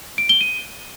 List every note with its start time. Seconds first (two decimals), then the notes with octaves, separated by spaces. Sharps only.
0.18 D7
0.29 G7
0.41 D#7